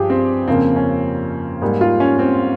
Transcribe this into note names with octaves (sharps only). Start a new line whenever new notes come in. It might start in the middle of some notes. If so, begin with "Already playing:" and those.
Already playing: G2 F3 G4 G#4
C4
F2 C#3 F3 A#3 C4
C#4
G#2 G3 A#3
F4
C#4
C4